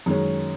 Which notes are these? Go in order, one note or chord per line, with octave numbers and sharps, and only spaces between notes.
F#2 D#3 G#3 C#4